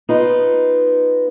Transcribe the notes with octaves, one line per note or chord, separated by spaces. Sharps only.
B3 D#4 F4